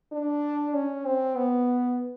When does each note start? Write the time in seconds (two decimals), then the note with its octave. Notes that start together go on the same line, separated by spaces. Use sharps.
0.12 D4
0.74 C#4
1.05 C4
1.36 B3